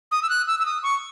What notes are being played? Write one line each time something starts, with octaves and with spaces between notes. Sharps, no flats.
D#6
E6
F#6
E6
E6
D#6
C#6